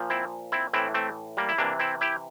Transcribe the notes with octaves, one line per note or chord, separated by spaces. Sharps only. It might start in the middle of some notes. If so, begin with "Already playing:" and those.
Already playing: A#2 F3
C4 E4
C4 E4
A2 E3 C4 E4
A3 C4
G3 A#3
E4
C3 E3 A#3 D4
C4 E4
E4 G4